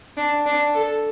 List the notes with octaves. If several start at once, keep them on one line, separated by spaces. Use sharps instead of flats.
D4
D4
A4